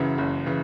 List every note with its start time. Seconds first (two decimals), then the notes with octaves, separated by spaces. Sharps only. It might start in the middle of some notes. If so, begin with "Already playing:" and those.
Already playing: F#2 C#3 E3
0.18 F#1
0.46 C#3 E3